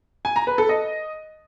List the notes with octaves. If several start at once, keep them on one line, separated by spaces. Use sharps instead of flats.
G#5
A#5
B4
A4
D#5